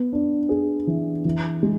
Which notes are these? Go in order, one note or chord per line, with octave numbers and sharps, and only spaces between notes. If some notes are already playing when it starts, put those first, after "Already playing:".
Already playing: B3
D4
G#4
E3
E3
G#3